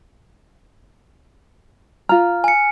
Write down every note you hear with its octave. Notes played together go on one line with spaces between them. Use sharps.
F4 A#5 F6
G#5 C#7